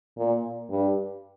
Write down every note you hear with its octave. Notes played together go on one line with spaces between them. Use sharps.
A#2
G2